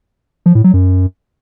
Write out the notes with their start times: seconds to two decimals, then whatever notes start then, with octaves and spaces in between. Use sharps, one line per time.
0.46 F3
0.55 A2
0.64 F#3
0.73 F#2